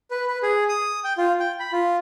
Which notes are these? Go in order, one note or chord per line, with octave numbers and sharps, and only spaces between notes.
B4
B4
G#4
D#6
G5
F4
G5
B5
F4